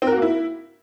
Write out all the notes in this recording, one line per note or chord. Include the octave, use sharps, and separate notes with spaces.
C4
A#4
F#4
A#3
E4